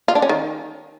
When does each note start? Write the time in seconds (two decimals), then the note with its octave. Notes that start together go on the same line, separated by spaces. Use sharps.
0.08 F4
0.15 D4
0.22 C#4
0.29 D#3